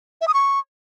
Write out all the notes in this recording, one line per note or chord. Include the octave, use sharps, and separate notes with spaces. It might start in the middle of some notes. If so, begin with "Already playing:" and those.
E5
D#6
C#6